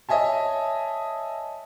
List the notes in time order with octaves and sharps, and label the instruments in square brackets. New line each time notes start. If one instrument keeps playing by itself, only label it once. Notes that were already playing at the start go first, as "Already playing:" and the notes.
[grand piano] C#5 D#5 E5 G#5 A5